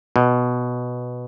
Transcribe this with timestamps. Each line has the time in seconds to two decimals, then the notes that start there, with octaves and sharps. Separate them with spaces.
0.16 B2